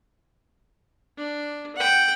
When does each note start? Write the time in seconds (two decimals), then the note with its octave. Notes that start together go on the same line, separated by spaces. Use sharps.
1.17 D4
1.76 F#5 G5